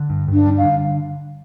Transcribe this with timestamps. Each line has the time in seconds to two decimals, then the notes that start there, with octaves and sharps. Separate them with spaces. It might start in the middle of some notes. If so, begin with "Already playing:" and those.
Already playing: D3
0.10 G2
0.28 G2
0.33 D4
0.46 G3
0.58 F5
0.63 D3